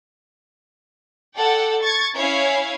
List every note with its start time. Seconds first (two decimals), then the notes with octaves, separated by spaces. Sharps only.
1.37 A4 D5 F#5 G5
1.83 C#6 G#6 A6
2.17 C#4 E4 C#5 F5 G#5